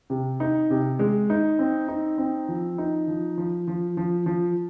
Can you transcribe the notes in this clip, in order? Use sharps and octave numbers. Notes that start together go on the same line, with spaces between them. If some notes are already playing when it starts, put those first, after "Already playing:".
C3
D#4
C3
G#3
D#4
C4
D#4
C4
F3
D#4
F3
F3
F3
F3
F3